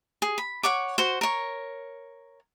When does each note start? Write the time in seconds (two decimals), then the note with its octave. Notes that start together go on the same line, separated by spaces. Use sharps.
0.22 G#4
0.38 B5
0.63 C#5 F#5 C#6 D6
0.98 F#4 C5
1.21 A#4 C#5